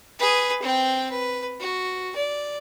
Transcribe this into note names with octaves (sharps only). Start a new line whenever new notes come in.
G#4 B4
C4 G5
B4
F#4
D5